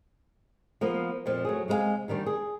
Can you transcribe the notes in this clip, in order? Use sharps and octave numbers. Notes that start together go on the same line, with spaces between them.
F3 A#3 B3
F2 A#2 F3
F#3 A3 G#4
C3 G#3 A#4 F5 G#5
D2 D#3 G3 D4
G#4